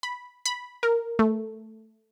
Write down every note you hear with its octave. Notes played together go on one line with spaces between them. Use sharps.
B5
B5
A#4
A3